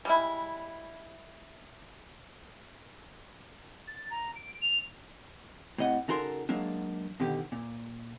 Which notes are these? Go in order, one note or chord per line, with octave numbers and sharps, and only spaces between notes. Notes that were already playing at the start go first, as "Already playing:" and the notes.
G3 G#3 E4
A6
A#5
D7
F7
A2 C3 D#5 F#5
C#3 D#4 F#4 A4 A#4 C6
F#3 G#3 A#3 D4
B2 D3 D#3 G4
A#2